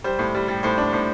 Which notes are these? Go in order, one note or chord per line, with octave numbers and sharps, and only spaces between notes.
G3 C5
A2
G3
G3
A2 C5
D4
A2 C5